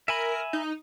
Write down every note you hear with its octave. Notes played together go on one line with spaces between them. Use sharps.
A#4 E5 G#5 B5
D#4